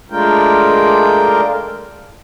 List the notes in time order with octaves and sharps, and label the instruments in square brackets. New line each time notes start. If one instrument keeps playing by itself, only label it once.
[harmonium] G#3 A3 D4 F4 A#4 G5